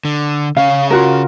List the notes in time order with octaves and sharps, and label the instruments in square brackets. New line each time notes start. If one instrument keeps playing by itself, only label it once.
[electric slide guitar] D3
[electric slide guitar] C#3 C#4 [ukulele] F5
[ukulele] F4 F#4 A#4